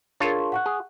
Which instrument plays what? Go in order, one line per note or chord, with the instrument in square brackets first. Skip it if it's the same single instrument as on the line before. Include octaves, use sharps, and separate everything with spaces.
[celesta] D4 G#4 A#4 [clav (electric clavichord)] F4 C#5 A5
[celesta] F#5 C#6 F#6
[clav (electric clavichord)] G#4